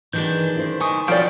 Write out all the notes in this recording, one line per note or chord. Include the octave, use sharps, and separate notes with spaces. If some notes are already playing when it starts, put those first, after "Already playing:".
D#3 E3 D4 G#4 G6
E4 C5
D#3 G#5 C#6 D#6
B2 F3 D5 G5